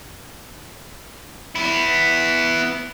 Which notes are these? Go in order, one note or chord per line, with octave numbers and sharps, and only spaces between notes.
B3 E4